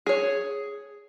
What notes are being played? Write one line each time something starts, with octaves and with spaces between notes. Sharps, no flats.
G#4 C#5